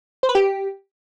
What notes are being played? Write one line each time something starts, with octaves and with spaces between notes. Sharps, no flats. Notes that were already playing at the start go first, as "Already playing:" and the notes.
C5
B4
G4